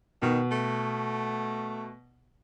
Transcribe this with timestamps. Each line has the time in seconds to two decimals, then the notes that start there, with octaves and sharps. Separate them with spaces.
0.22 B2 D#3
0.51 A3